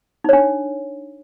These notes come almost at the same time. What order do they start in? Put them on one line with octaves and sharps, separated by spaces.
D#4 C#5 D4